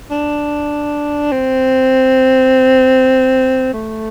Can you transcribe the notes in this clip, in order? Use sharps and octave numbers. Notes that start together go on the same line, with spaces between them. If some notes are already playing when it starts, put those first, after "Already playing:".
D4
C4
A3